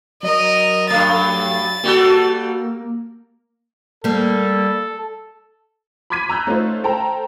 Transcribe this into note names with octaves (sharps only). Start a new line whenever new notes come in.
F#3 A#4 D#5
G2 A3 A6
G3 A#3 F#4 A4
G3 A#3 A4
B5 C6 D6 G#6 B6 D#7
A#5 E6 F#6 G6
A3 C#4 D#4 F4 C5
A4 C5 G5 A5 A#5